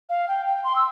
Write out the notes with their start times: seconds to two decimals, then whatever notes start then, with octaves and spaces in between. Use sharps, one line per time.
0.09 F5
0.28 G5
0.46 G5
0.64 C6
0.76 E6